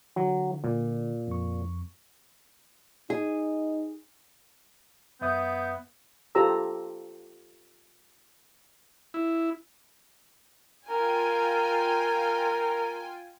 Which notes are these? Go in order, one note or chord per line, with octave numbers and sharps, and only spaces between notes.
D3 F#3
A#2
F2 C#6
D#4 G#4
F#2 B3 E5 D#6 G6
F4 G4 A4 C5 A#5 E6
E4
F4 A#4 G5 G#5